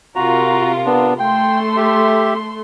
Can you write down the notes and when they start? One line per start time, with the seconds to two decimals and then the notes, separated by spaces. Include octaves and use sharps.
0.16 C3 F4 F#4 A#4 A#5
0.86 B3 D4
1.20 A3 G5 C6
1.76 G4 E5